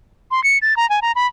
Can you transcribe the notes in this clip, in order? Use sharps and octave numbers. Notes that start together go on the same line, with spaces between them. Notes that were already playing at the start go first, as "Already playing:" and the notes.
C6
C#7
A6
A#5
G#5
A#5
B5